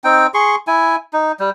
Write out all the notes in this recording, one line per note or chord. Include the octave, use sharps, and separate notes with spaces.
C4 D#4 G5
G#4 C6 C#6
E4 G#5
D#4
G3